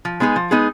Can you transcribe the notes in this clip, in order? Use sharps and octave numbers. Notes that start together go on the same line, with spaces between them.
F3
G#3 B3 D#4 G#4
F3
G#3 B3 D#4 G#4